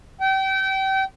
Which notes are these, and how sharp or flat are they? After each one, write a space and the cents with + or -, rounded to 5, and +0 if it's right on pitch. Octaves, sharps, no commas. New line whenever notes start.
G5 -30